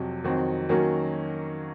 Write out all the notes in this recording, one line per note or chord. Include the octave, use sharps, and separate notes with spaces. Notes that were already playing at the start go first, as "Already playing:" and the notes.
Already playing: F2 C3 F#3
F2 D#3 F#3 C4 F#4
D#3 F#3 A#3 C#4 F#4